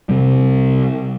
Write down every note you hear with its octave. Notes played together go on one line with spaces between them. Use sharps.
C3 G3